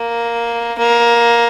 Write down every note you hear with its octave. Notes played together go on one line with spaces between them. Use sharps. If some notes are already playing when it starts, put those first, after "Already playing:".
Already playing: A#3
A#3